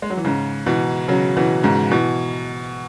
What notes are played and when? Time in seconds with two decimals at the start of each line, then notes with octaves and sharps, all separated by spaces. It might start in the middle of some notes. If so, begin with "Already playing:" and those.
0.02 G#3
0.10 F#3
0.17 E3
0.25 G#2 C#3
0.66 B2 E3
1.08 C#3 F#3
1.36 B2 E3
1.63 G#2 C#3
1.91 B2 E3